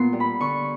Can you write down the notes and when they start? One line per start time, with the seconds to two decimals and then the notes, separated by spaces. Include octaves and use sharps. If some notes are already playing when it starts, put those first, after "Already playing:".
Already playing: A#2 B3 C6
0.13 G3
0.20 B5
0.40 D3 C#6